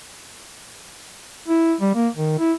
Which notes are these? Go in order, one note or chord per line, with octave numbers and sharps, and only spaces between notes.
E4
G3
A#3
D#3
E4